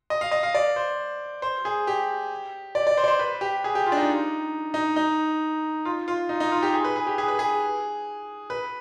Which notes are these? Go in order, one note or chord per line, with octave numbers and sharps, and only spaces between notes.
D#5
F5
D#5
F5
D5
C5
C5
G#4
G4
D5
D5
C5
D5
C5
B4
G4
G#4
G4
F4
D4
D#4
D#4
D#4
F4
F4
D#4
D#4
F4
G4
G#4
B4
G#4
G4
G#4
B4
G#4
B4